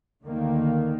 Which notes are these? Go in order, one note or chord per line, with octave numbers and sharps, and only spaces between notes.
D2 D3 D#3 A#3